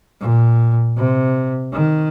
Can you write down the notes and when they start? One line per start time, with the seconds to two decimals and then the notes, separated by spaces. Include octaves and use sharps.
0.20 A#2
0.97 C3
1.72 D#3